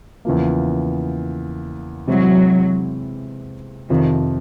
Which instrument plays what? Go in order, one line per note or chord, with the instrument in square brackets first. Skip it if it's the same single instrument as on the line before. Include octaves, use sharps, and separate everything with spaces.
[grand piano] E2 C#3 F3 A#3
[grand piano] C3 E3 G#3 C4 E4 [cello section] F#3
[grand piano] F2 C3 F3 [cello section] D#3